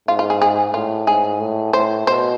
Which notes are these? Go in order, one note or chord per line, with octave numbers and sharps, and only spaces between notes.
G#2 F4
F4
G#4
G#4
A2 F4
G#2 G#4
A2
A2 C5
B2 C5